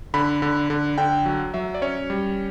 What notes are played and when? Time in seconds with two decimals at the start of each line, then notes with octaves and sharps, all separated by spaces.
0.14 D3 B5
0.42 D3
0.70 D3
0.98 D3 G5
1.26 F#3
1.54 F#3 E5
1.74 D5
1.82 C#4 C#5
2.10 G3